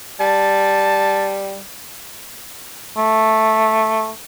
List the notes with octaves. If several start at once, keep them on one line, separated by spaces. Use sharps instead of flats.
G3 A5
A3